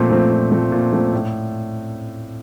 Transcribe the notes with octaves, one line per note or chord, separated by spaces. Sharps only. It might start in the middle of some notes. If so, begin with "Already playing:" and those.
Already playing: A#2 F3 A3 C4
F3 A3 C4
A#2
F3 A3 C4
A#2
F3 A3 C4
A2